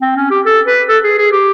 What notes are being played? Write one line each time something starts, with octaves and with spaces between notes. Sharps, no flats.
C4
C#4
G4
A4
B4
A4
G#4
G#4
G4